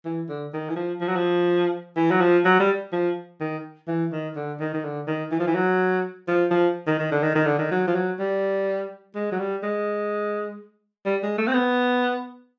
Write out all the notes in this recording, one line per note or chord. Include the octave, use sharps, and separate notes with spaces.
E3
D3
D#3
E3
F3
F3
F#3
F3
E3
F#3
F3
F#3
G3
F3
D#3
E3
D#3
D3
D#3
D#3
D3
D#3
E3
F3
E3
F#3
F3
F3
D#3
D#3
D3
D#3
D#3
D3
D#3
F#3
F3
F#3
G3
G#3
F#3
G3
G#3
G3
G#3
A3
C4
B3